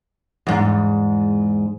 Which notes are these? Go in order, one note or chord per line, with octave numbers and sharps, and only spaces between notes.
E2 G#2